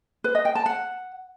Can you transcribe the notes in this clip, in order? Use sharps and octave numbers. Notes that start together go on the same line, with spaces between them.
B4
D#5
G5
A5
F#5